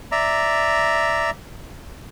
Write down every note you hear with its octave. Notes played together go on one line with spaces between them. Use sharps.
D5 E5 A#5